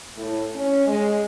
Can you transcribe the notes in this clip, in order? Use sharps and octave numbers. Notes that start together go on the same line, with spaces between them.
A2
C#4
G#3